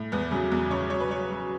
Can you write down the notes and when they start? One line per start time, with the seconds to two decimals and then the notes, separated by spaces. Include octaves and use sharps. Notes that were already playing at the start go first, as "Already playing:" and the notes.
Already playing: A2
0.12 E2 B3
0.31 C#3 F#3
0.52 E2
0.70 C#3 C#5
0.90 F#3 C#5
1.00 B4
1.09 F#3 C#5
1.30 F#3